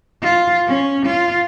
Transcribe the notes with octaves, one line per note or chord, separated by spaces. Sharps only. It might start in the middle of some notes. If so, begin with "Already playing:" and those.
F4
C#4
F4